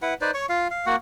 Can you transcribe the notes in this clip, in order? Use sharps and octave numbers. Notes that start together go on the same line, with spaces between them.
E4 B4 F#5
D#4 B4 C5 D5
C#5 C#6
F4 F5
F5
A#3 F#4 F#5